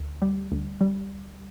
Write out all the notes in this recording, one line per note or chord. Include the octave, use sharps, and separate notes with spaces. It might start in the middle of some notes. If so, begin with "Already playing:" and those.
Already playing: D2
G3
D2
G3